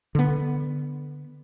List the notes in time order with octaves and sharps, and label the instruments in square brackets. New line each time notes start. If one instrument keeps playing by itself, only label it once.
[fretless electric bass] D3 B3